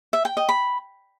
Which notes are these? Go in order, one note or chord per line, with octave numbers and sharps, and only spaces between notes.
E5
G5
D#5
B5